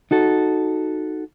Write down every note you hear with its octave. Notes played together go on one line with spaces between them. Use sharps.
D#4 F#4 A4